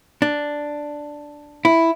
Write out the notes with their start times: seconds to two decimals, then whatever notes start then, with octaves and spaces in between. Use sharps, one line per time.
0.22 D4
1.65 E4